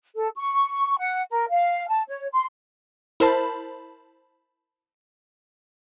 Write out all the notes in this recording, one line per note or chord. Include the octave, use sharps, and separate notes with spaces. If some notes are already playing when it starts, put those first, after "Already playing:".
A4
C#6
F#5
A#4
F5
A5
C#5
C6
E4 A#4 C5 A5 B5